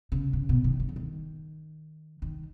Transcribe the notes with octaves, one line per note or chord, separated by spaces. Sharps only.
C#3
C#3
B2
D#3
D#3
C#3
D#3
D#3